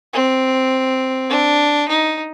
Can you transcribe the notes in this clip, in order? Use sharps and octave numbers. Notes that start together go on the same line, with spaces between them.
C4
D4
D#4